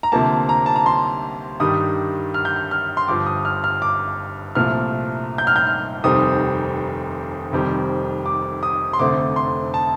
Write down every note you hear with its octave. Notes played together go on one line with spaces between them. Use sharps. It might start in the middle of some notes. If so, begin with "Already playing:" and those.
A#5
D2 C3 F3 A#3 A5
A#5
A5
A#5
C6
G2 D#3 G3 D#6
F6
G6
F6
F6
C6
G1 G2 F3 D6
D#6
F6
F6
D6
C2 A#2 F3 A3 F6
G6
F6
G6
F6
F1 D#2 D#3 G3 C4 D#6
F1 F2 D#3 G3 C4
D6
D#6
C6
F1 F2 D3 A3 C4 D6
C6
A5